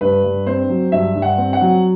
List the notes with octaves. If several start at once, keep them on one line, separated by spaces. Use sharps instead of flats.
G2 B4
G2
C4 C5
F#3
G2 E5
G2
F#5
C4
F#5
F#3